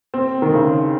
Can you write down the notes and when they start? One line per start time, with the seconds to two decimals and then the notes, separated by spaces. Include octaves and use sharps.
0.14 C4
0.42 D#3
0.54 C#3